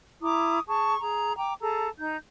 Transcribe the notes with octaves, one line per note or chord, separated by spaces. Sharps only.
E4 A#5 D6 D#6
G#4 A5 C#6
G#4 A#5
G5 A#5 D6
G#4 A4 A5 A#5
D#4 G6